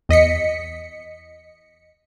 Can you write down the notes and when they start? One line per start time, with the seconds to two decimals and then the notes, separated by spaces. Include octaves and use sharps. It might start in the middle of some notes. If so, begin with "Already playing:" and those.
0.09 E2 D#5 B6 C#7